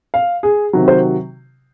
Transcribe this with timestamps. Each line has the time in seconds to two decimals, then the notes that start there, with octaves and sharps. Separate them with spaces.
0.14 F5
0.43 G#4
0.73 C3 D#3 F#3
0.88 C5